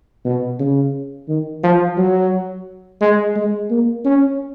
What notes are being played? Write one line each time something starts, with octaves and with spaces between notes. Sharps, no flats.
B2
C#3
D#3
F3
F#3
G#3
G#3
A#3
C#4